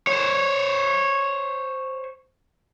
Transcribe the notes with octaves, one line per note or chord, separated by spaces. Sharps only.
C5 C#5